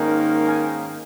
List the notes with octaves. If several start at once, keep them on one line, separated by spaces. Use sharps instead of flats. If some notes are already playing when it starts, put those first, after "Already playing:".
Already playing: G#2 D#3 A#3 C#4
G#5